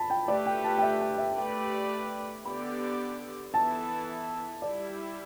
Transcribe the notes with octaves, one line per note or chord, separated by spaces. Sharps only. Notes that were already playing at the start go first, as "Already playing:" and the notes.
Already playing: A5 B5
G5
A3 G4 B4 D5
G5
A5
G5
E5
G5
E5
A3 G4 B4 D5 G5
D3 B3 G4 D5 B5
E3 B3 E4 A4 A5
G3 E4 G4 D5